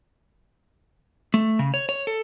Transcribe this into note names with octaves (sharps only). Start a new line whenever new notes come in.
A3
C#3
C#5
C#5
A4